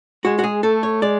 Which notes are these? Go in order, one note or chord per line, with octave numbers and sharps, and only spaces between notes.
G#3 F#4
F#4
G#4
A3 A4
C#5
G#3 D5